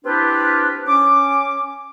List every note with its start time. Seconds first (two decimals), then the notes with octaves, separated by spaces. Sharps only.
0.05 C4 D4 E4 F4 G4 B4
0.86 C#4 D6